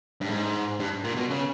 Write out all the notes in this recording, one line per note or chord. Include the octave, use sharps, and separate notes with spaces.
G2
G#2
G2
A#2
B2
C#3